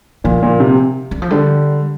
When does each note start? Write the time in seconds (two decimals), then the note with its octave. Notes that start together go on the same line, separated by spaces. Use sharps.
0.24 A#2 F3
0.43 A#2
0.60 C3
1.11 D3
1.22 F3
1.30 D3 G3